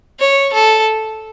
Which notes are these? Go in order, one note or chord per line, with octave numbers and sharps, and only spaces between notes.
C#5
A4